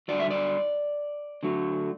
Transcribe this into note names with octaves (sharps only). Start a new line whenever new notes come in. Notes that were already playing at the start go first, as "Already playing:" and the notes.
G2 D3 F#3 D5
E5
D5
D3 F#3 A3